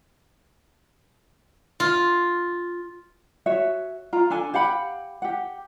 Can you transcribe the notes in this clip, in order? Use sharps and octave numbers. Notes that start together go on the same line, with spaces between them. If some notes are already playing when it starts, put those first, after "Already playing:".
F4
F#4 C#5 E5
F4 A#5
D4 A4 G#5
G4 F5 F#5 B5
G4 F#5